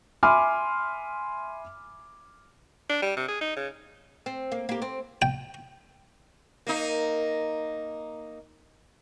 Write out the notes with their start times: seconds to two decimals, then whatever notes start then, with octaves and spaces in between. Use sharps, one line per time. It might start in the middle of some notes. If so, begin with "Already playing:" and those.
0.23 E5 G#5 B5 C6 D6 F6
2.89 D4
3.02 G3
3.17 C3
3.28 G#4
3.41 D#4
3.57 C#3
4.26 C4
4.52 A#3
4.69 A#3 G4
4.82 C4
5.22 G5
6.67 A#3 D#4